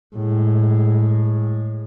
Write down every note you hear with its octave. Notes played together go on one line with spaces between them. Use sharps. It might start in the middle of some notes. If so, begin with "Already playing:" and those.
A2 G#3